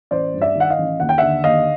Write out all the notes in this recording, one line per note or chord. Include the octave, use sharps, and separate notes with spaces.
A1 C5 D5
G2
D5 E5
D#3
F#5
D#5 F5
A1
D#2 F#5
G5
D3 E5 F#5
D#2 D#5 F5